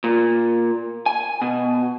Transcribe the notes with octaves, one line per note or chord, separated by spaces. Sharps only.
A#2
G#5
B2